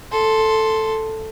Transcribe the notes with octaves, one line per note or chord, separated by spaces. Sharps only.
A4 C6